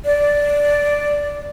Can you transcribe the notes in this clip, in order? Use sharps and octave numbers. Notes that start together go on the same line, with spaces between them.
D5